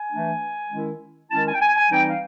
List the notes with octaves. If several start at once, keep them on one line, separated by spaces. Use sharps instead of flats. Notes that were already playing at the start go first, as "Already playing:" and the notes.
Already playing: G#5
E3 A3 D4
D#3 G#3 C#4 E4
D#3 G#3 C#4 E4 A5
G#5
G5
G#5
G#5
E3 G3 C4 D#4 G5
F5